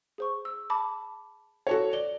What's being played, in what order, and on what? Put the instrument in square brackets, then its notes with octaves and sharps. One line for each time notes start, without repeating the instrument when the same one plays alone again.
[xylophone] G#4 C5 C#6
E6
A5 B5 D6
[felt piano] F#4 A4 C#5
[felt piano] D5 [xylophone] G7